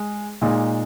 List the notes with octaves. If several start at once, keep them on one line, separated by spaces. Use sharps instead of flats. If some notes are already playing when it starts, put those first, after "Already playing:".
Already playing: G#3
A#2 G#3 D#4